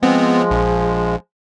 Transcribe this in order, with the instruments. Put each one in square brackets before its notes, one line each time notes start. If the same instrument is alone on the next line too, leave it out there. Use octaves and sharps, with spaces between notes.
[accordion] F3 G#3 [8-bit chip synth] B3 C4
[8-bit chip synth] A#1